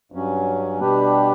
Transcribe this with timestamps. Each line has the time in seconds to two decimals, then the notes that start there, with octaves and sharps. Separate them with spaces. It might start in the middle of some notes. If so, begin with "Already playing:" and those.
0.12 G2 F#3 C#4
0.80 B2 G3 D4 G4 B4